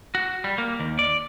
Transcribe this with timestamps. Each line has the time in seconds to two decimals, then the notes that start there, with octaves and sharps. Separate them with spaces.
0.15 F#4
0.44 G3
0.58 A#3
0.80 D#2
0.99 D5